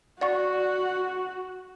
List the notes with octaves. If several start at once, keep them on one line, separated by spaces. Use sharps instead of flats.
F#4 D5 F#5 C#6